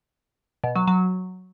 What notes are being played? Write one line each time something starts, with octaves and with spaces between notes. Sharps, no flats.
B2
F#3
F#3